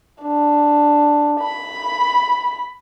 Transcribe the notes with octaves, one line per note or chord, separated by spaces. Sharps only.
D4
B5